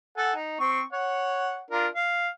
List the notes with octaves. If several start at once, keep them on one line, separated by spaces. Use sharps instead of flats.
A4 F#5 G#5
D#4
C4 C#6
C#5 F#5
D4 F4 A#4
F5